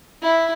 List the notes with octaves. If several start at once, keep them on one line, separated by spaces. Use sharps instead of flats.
E4